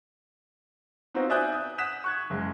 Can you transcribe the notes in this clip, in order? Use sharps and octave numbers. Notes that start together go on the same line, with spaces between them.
B3 C4 D#4 F4 F#4 C5
D5 E5 G#5 D#6 F#6 G6
D#6
F#5 D#6 F#6 B6 E7
C#6 F#6 G#6
F#1 G#3